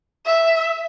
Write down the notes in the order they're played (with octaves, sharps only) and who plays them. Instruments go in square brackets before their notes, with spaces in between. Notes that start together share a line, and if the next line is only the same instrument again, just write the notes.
[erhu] E5